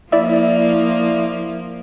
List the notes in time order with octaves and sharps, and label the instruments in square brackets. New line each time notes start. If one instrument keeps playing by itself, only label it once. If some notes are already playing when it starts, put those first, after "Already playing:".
[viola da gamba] F3 A#3 [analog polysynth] E4 D5 E5